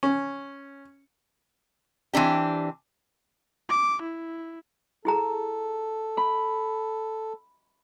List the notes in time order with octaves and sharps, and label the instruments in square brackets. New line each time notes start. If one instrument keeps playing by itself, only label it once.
[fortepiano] C#4
[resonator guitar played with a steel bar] E3 C4 D4 G4
[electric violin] D6
E4
[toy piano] E4 G#4 A#5 [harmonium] A4
[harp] B5